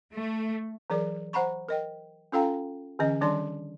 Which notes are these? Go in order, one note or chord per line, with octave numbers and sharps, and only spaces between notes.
A3
E3 F#3 G#4 A#4 D5
C5 F#5 A#5 B5 C#6
A#4 D#5 G5
C#4 F4 A4 F5 G5 A#5
D3 E3 C#4 D#5
D#3 G3 D4 D5 C6